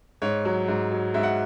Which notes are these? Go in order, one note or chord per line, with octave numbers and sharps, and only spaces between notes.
G#2 C#5
F#3
G#2
F#3
G#2 E5
F#5